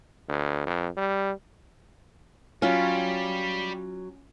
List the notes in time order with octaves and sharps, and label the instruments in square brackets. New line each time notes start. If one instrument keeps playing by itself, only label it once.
[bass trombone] D2
F2
G3
[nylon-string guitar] F#3 F5 [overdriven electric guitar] G3 [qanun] C#4 F4